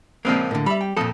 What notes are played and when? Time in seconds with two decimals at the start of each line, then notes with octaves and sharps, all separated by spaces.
0.25 C#2 A#2 F3 A#3 C4
0.51 A2 D3 A#3
0.66 G3 E5 B5
0.81 G5
0.97 F2 A#2 F3 A4 D#6